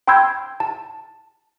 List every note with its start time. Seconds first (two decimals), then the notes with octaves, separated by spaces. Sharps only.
0.08 G5 B5 C6 E6 G6 G#6
0.60 A5